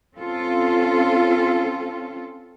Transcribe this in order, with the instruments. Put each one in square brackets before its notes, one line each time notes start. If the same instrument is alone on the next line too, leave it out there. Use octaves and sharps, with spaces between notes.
[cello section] C4 C#4 F4 A4